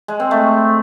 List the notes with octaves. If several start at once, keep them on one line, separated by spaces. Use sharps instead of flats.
G#3
C4
A3